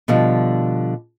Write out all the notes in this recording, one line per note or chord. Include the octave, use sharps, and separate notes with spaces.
B2 D3 F3 G3